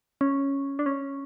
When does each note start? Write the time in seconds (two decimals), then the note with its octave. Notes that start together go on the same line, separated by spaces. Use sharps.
0.21 C#4
0.79 D4
0.86 C#4